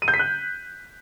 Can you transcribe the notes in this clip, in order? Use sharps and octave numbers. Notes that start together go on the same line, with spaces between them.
D#7
G6
B6
F#6